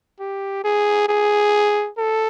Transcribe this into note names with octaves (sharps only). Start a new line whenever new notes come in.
G4
G#4
G#4
A4